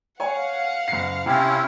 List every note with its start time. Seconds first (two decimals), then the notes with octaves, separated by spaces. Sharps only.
0.20 C#5 F5 F#5 G#5
0.88 F#1 C7
1.26 C3 C4 C#4 E4